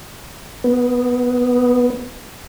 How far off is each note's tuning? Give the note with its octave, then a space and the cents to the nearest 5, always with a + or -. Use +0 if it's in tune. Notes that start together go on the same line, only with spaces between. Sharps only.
B3 +0